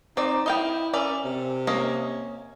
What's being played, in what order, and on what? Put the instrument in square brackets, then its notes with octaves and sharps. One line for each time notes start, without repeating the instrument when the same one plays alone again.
[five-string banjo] C4 D5 [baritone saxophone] D#4
[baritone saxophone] E4 [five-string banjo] D#5 F5 G5
[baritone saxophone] C#4 [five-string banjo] A#4 D5 E5
[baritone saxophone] C3
[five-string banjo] A#3 C#4 D#5